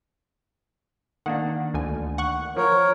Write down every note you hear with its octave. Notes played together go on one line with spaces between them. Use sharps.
D#3 A#3 D4 F#5
D2 G#5
F#5 C#6 F#6
F3 A#4 C#5